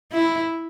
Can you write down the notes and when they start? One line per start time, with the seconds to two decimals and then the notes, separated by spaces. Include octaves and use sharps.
0.12 E4